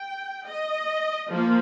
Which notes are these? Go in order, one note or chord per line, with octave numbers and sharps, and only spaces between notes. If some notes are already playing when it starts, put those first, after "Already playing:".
Already playing: G5
D#5
F3 A#3